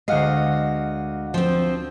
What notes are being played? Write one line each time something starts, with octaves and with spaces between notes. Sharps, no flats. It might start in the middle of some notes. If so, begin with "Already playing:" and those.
D2 G#3 D#5 F5 F#5 C7
F3 C4